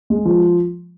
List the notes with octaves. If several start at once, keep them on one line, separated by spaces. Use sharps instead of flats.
G#3
F3